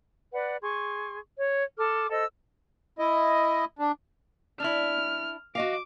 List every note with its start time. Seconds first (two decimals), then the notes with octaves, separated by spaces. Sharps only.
0.33 B4 D5 F#5
0.62 G#4 C6 C#6
1.37 C#5
1.78 A4 D6 F6
2.10 A4 C5 D#5 E6
2.99 E4 D#5
3.79 D4
4.60 D4 E4 F6
5.55 F#4 D#5 F5 D6